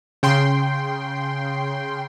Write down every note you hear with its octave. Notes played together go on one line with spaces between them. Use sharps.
C#3 G5 C6